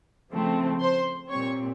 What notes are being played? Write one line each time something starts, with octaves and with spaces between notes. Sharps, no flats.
C#3 F3 A3 C4
C5 C6
A#2 G3 C4 C#5 C#6